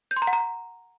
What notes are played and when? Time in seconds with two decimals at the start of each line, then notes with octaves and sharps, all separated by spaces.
0.11 G6
0.17 C6
0.22 A#5
0.27 F#5
0.33 A#5